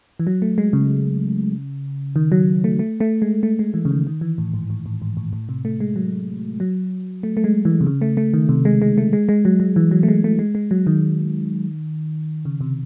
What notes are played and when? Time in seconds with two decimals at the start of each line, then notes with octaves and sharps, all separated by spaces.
0.19 E3
0.27 F#3
0.42 A3
0.58 G#3
0.73 C#3
2.16 D#3
2.32 F#3
2.64 A3
2.79 A3
3.00 A3
3.22 G#3
3.43 A3
3.59 G#3
3.74 E3
3.85 C#3
3.91 D#3
4.07 D#3
4.21 E3
4.38 A2
4.54 G#2
4.70 A2
4.86 A2
5.02 G#2
5.17 A2
5.33 A2
5.49 C3
5.65 A3
5.80 G#3
5.96 F#3
6.60 F#3
7.23 A3
7.37 A3
7.44 G#3
7.65 E3
7.81 C3
7.87 C#3
8.02 A3
8.17 A3
8.34 D#3
8.49 C3
8.65 G#3
8.82 G#3
8.98 A3
9.13 G#3
9.29 G#3
9.45 F#3
9.60 F#3
9.76 E3
9.91 F#3
10.03 A3
10.08 G#3
10.24 A3
10.39 G#3
10.55 G#3
10.71 F#3
10.87 D#3
12.45 C#3
12.61 C3